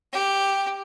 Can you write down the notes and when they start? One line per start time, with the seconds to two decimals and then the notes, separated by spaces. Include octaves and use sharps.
0.13 G4